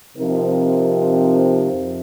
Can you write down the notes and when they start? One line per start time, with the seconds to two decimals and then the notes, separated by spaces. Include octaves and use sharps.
0.17 C3 F3 C4 D#4 A#4
1.72 F2